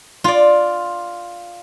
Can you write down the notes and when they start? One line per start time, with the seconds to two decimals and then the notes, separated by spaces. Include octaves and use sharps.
0.24 F4 D5